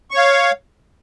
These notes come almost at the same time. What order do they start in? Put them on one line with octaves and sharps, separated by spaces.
C#6 C#5 F5